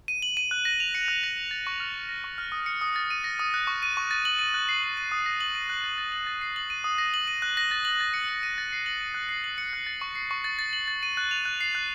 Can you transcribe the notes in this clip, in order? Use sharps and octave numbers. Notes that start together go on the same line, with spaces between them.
D#7
F#7
D#7
F#6
A#6
F7
C#7
F#6
A#6
D#7
A6
C#6
F6
F7
A#6
C#6
F6
D#6
C#7
D#6
A6
D#7
A#6
D#6
F#6
C#6
D#7
C#6
A6
F#7
D#7
F#6
C7
F#7
D#7
D#6
A#6
F#7
D#7
F#6
A6
A6
F#7
A6
C7
F#7
D#7
D#6
A#6
F#7
D#7
F#6
A#6
A6
F#7
A6
C#7
F#7
D#7
A6
C7
F#7
D#7
F#6
C7
F#7
C#7
F#6
A6
C#6
C7
C#6
A6
A6
F#7
A6
D#7
F#6
F7
F#6
C7
F#6